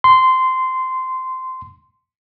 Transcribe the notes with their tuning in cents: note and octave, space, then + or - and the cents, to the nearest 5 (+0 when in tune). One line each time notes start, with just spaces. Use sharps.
C6 -15